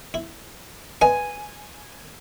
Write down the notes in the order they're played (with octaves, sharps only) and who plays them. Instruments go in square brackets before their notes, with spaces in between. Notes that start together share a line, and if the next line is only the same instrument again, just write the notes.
[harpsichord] E4
[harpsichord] B4 D#5 F5 [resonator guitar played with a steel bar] G#5